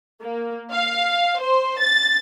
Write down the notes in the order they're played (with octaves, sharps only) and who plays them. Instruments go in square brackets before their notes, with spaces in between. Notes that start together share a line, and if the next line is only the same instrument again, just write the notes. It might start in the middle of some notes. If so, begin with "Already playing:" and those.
[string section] A#3
F5
C5
A6